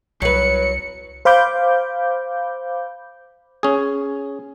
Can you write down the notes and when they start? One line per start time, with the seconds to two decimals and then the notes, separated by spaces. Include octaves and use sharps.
0.22 C2 F#3 B4 C#7
1.25 C5 F5 B5 D6 G6
3.63 C#4 G#4